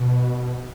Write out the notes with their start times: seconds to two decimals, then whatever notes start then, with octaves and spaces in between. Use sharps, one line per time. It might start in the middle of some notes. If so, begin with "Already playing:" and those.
Already playing: B2